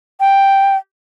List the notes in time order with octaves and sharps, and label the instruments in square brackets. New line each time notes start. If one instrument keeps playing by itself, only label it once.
[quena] G5